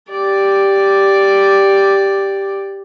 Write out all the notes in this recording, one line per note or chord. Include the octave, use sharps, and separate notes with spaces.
G4 D5